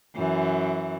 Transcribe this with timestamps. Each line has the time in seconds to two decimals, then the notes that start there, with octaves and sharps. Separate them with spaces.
0.16 F#2 E3